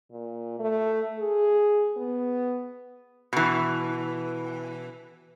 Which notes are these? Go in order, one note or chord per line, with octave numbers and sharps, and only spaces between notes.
A#2
A3
G#4
B3
B2 E3